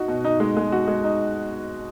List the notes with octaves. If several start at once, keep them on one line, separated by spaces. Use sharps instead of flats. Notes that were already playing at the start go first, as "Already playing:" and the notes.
Already playing: D#4 F#4
B2
D#4
G#3
G#3
F#4
G#3
D#4